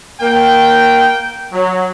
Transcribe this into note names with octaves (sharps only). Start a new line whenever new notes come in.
A#3 G5
F#3